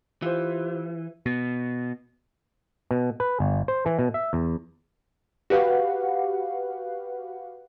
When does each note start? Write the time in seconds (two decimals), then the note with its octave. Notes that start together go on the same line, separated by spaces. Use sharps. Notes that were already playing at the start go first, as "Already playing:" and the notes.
0.22 E3 F4 G4 C5
1.26 B2
2.91 B2
3.20 B4
3.40 G1
3.68 C5
3.86 E3
3.99 B2
4.14 E5
4.33 E2
5.50 F#4 G4 B4 F5 F#5